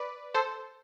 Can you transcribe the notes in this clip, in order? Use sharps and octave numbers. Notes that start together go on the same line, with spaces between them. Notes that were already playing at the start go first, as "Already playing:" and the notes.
Already playing: B4 D5
A4 C5